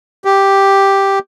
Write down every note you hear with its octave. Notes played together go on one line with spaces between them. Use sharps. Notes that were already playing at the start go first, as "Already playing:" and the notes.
G4